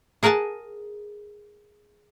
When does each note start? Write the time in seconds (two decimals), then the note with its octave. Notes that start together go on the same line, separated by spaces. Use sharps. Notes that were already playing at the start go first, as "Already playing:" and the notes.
0.23 G#4 A#4 F#5 G#5 A5